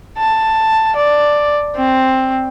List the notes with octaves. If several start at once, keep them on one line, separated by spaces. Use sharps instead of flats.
A5
D5
C4